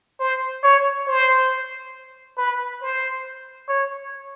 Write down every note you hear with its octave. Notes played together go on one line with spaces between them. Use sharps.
C5
C#5
C5
B4
C5
C#5